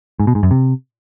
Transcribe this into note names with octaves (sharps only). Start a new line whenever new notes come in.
G#2
B2
G#2
F#2
C3